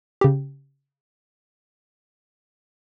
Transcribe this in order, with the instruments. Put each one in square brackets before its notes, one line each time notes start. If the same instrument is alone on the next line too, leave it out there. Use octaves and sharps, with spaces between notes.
[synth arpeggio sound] C#3 G4